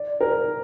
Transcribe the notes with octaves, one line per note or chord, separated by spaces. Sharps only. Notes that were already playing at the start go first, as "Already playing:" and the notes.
Already playing: D5
A#4